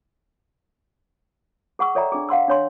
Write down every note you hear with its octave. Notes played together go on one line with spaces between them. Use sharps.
G#4 F#5 C#6 E6
A4 C#5 D5 E5 G5 A#5
D4 G#4
F5 F#5 C6 E6
D4 C#5 C6